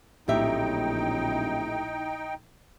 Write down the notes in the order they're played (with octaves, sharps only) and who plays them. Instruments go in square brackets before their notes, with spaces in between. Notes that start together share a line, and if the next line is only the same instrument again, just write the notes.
[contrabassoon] D1 [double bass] A#1 E4 [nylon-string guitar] A2 G4 E5 [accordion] D#4 G5